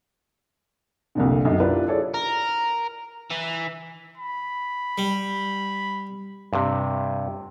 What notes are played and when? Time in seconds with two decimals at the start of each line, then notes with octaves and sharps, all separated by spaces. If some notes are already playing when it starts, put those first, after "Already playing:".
1.15 C2 F2 A#2 D3
1.45 B1 F#2
1.60 D4 E4 F4 G4 A#4 B4
1.86 E4 F4 G#4 A4 C#5 D5
2.14 A#4
3.30 E3
4.17 B5
4.98 G3
6.53 G2 C3